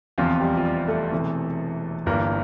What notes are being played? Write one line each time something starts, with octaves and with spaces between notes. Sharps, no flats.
F1 E2 C3 E3 F3 F4
G3 G4
F4
G3 G4
A3 A4
E1 E2 C3 E3
G1 G2 E3 A#3 A#4